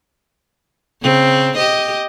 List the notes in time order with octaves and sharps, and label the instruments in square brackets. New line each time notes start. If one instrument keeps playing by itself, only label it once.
[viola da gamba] C#3 C4
G4 D#5